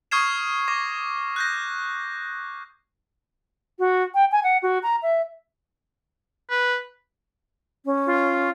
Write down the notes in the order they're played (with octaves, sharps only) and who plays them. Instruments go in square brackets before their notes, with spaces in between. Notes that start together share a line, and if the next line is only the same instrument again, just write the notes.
[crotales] C#6 D#6 F6 G#6 C7 E7
C#6 D6 A#6
F#6 G6 A#6
[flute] F#4
G5
G#5
F#5
F#4
A#5
E5
[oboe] B4
[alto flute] C#4
[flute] F4